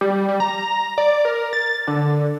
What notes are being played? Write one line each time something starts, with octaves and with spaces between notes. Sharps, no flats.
G3
G3
A#5
A#5
D5
A#4
A6
D3